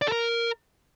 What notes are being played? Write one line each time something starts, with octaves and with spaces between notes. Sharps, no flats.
D5
A4
A#4